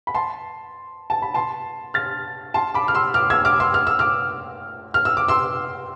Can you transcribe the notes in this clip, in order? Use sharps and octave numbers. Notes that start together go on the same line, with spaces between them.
B5
A5 C6
A5
B5
A5 C6
F6 A6
A5 C6
B5 D6
F6
C6 E6
D6 F6
E6 G#6
D6 F6
C6 E6
F6
E6
D6 F6
F6
E6
D6
C6 E6